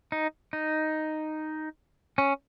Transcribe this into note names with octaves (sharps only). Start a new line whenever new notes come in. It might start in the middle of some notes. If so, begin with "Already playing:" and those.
D#4
D#4
C#4